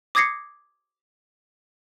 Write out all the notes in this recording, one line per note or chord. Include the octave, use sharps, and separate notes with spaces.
D6 D#6 G#6 A#6 C7 C#7